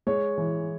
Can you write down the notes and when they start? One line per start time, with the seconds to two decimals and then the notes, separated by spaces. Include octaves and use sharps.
0.07 G#3 C#5
0.38 E3